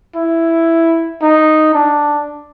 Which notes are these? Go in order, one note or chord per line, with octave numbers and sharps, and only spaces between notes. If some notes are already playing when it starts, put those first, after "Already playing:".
E4
D#4
D4